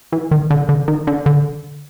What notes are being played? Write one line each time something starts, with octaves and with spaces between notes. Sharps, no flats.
E3
D#3
D3
D3
D#3
D3
D3